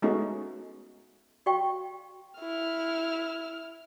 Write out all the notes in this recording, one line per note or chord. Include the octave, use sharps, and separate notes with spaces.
G#3 A3 B3 C#4 D#4 F#4
F#4 D5 F5 G5 C#6
E4 F6